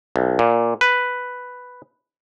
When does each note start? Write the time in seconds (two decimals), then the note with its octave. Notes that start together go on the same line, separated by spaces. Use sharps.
0.16 B1
0.39 A#2
0.81 B4